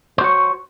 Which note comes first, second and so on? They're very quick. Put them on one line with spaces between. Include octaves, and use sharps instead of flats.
C5 F#4 C#5